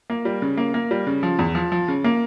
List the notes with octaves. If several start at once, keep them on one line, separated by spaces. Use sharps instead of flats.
A#3
G3
C#3
A#3
A#3
G3
C#3
F3
E2
F3
F3
C#3
A#3